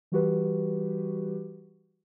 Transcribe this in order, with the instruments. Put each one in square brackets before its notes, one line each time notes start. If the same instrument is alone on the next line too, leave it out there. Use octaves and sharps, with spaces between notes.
[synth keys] E3 G3 F#4 G4 B4